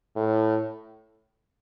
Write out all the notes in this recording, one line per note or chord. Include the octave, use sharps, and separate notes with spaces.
A2